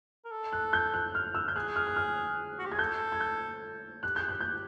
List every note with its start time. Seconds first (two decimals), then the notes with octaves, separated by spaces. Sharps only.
0.25 A#4
0.31 A4
0.52 F#6
0.73 G6
0.94 F#6
1.15 F6
1.35 E6
1.48 G6
1.56 G#4 F#6
1.76 F6
1.87 F#6
1.96 F6
2.59 F#4
2.65 G4
2.72 G#4 G#6
2.79 A4 G6
3.12 G#6
3.21 G6
4.03 G4 F#6
4.16 G#4 G6
4.28 G4 F#6
4.41 G6